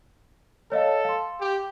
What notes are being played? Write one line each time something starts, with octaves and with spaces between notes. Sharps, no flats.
A4 C#5 D#5 F5
F5 C6
G4